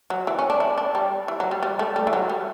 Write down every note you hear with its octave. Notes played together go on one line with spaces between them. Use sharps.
F#3
E3
C#4
D4
E4
D4
G3
E3
F#3
G3
G3
A3
G3
E3
F#3
G3